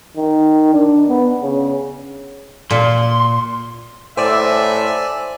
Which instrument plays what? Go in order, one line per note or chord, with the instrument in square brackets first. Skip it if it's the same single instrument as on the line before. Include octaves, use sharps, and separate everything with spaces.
[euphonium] D#3
D4
B3
C#3
[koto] A#2 [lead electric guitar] C6
[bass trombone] A2 [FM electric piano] C5 D6 E6 [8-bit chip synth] D5 G#5 [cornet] E5